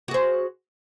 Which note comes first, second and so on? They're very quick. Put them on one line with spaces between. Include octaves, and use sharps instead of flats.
F#4 G#4 C5